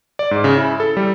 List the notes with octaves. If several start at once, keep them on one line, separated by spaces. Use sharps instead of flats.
D5
G#2
C#3
E4
A4
G3